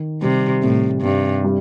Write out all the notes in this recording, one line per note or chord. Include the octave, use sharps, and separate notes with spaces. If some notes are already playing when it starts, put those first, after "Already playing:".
Already playing: D#3
C3 G3
A2 C3
G2 C3
G3